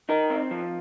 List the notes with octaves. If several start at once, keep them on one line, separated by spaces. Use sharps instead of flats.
D#4 A#4
C4
F3